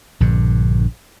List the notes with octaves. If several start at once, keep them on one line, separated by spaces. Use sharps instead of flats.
A#1 G2 D3